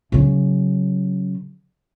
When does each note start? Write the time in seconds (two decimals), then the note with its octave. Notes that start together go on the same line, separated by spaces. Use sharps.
0.12 C#3 F#3